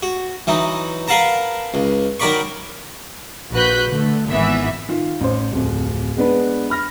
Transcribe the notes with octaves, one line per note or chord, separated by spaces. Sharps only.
F#4
E3 F#3 D#4
A#4 B4 F5 F#5 A5 A#5
C#2
D#3 F#3 A#4 D5 B5 C#6
A#1 F#4 B4 F#6 G6 B6
D3 A3
G#1 E3 B3 E5
D#3 F4
A1 C5
D1 F2
G#3 B3 D4 B4
B5 F6 A#6